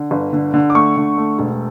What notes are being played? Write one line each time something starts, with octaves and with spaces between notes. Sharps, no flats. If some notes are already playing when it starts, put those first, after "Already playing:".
Already playing: D3
G1
D3
D3
D6
A3 C#6
D3
A3
E1